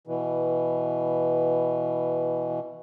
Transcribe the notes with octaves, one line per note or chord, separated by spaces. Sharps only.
B2 E3